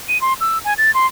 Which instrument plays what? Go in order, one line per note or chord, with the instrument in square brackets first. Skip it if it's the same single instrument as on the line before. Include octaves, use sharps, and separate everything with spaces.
[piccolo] D#7
C6
E6
G#5
A6
C6